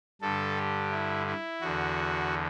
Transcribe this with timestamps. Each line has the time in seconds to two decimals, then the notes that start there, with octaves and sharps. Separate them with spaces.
0.21 G2 D3 A4
0.57 G4
0.91 E4
1.26 E4
1.61 E2 D3 F#4